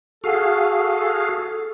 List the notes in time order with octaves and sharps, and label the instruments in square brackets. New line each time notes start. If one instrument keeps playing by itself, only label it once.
[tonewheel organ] F#4 G#4 F5 [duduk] A4